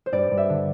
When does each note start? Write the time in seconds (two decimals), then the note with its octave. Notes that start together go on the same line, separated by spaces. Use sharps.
0.06 C5
0.12 G2 D5
0.31 G2
0.37 E5
0.49 D3